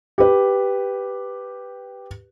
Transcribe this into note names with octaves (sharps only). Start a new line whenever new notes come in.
G4 B4